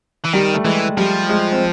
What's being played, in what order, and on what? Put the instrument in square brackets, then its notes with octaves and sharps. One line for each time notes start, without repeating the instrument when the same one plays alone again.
[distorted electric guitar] E3
[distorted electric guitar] D#3 [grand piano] G3
[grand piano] A3
[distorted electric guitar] E3 [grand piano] G#3
[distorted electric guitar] F3 [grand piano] G3
[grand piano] G#3
C4